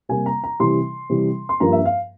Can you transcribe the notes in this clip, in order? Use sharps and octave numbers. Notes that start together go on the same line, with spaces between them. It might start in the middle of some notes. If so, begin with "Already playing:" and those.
C3 G3 A#3 G#5
A#5
A#5
C3 E3 G3 C6
C3 E3 G3
C6
G2 F3 A#3 A#5
E5
F5